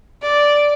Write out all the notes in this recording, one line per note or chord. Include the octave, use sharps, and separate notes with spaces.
D5